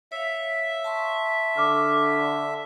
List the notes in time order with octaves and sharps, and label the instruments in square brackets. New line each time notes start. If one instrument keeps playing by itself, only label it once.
[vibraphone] C#5 F5 [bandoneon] E5
[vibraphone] A5 C6 C#6
[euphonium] D3 [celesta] D6 F6